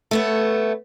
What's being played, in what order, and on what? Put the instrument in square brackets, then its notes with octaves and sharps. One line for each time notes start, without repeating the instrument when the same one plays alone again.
[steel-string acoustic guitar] A3 B3 C#5